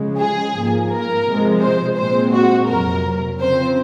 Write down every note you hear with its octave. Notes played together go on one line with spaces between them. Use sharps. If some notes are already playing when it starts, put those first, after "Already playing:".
Already playing: C#3 F3 G#3
G#4
G#2 F3 A#3
A#4
C3 F3 G#3
C5
A#2 G#3 C4 C5
F#4
F2 C3 F#3 A#4
C#3 F3 C4 C5